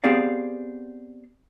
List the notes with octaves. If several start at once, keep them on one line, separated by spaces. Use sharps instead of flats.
B3 C4 G4 G#4 D5 F5